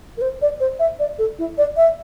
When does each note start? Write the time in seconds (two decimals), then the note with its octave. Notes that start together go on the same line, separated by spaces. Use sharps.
0.17 A#4
0.21 C5
0.42 D5
0.60 C5
0.79 E5
0.99 D5
1.19 A4
1.39 E4
1.58 D5
1.77 E5